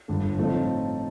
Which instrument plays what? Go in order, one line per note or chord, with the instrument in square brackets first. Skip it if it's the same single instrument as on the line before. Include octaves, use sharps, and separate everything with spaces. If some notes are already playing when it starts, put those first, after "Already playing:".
[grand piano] G1 G2 D3 A3
A2 F3 A3 C4 D#4